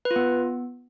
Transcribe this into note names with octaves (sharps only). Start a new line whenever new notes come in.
B4
F4
B3